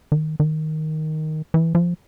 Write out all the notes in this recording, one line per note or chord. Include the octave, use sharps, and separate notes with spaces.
D#3
D#3
E3
F3